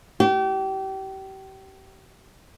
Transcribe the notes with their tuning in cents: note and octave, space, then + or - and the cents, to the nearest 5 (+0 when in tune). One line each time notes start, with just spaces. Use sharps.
G4 -30